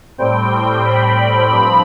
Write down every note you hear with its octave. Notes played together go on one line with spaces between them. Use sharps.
A2 G3 C4 G5
B5
G2 F3 C4 B5